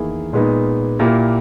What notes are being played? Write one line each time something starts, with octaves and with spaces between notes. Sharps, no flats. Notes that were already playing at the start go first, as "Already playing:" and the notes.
Already playing: E2 D#3 A#3 E4 G#4
A#2 G#3 B3 D#4
A#2 A#3 E4 G4